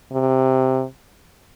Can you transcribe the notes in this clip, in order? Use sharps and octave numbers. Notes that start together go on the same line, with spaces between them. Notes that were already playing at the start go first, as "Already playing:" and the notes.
C3